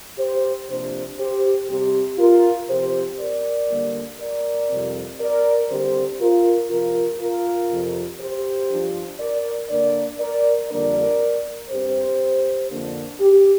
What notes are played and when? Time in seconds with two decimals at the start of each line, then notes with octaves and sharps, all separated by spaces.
0.18 G4 C5
0.68 C3 F3 A#3 D4 G4 C5
1.19 G4 C5
1.69 C3 G3 C4 G4
2.18 F4 A#4
2.69 C3 F3 C4 G4 C5
3.20 A#4 D5
3.70 D3 G3 A#3
4.19 A#4 D5
4.69 F2 C3 G3 C4
5.19 A#4 D5
5.69 D3 G3 C4 G4 C5
6.19 F4 A#4
6.69 C3 F3 C4 F4 A#4
7.19 F4 A#4
7.69 F2 C3 F3
8.19 G4 C5
8.70 G2 F3 D4
9.20 A#4 D5
9.70 D3 A#3 D4 A#4 D5
10.19 A#4 D5
10.70 F2 D3 G3 A#3 D4 A#4 D5
11.70 G2 G3 C4 G4 C5
12.70 F2 D3 A#3 D4
13.20 G4